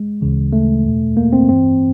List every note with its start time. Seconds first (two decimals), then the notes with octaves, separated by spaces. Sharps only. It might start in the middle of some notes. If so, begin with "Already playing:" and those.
Already playing: G#3
0.21 D2 C#3 E3
0.53 A3
0.84 E2 B2
1.17 A#3
1.33 C4
1.48 G2 E3 C4